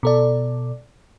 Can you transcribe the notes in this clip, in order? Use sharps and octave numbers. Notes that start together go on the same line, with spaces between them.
B2 A4 D5